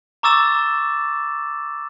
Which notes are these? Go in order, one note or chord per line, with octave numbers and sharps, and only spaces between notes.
A#5 C#6 D6 E6 A6 E7